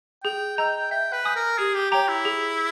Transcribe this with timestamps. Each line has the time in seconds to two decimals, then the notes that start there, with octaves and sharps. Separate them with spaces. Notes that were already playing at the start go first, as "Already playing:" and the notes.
0.24 G#4 G5
0.58 D#5 G5 A#5 E6 G6
0.91 E5 G5
1.13 B4
1.25 G#5 D#6 G6
1.36 A#4
1.58 G4 G#4
1.75 G4
1.92 G4 C#5 G5 A#5
2.09 E4
2.25 G#4